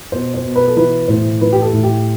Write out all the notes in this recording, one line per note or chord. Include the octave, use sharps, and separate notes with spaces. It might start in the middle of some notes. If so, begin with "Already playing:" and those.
B2 C5
C5
B2
B4
A4
E3 B4
A2 C5
E3 B4
G4
A4
A2
G4